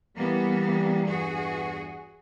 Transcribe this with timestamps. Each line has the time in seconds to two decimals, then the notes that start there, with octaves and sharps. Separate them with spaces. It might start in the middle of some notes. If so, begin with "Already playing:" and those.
0.17 E3 G3 A#3 B3
1.06 E2 G2 F#4 G#4